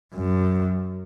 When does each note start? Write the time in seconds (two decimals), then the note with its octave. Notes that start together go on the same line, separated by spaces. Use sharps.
0.15 F#2